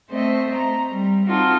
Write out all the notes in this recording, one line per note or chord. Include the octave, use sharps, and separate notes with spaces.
A3 C4 C5 D#5
A#5
G3
C4 D#4 F4 F#4 A4